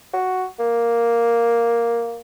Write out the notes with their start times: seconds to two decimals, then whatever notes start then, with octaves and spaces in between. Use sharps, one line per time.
0.13 F#4
0.60 A#3